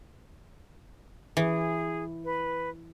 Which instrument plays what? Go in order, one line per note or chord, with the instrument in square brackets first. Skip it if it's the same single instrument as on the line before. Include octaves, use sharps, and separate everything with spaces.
[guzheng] E3 [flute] G#4
[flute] B4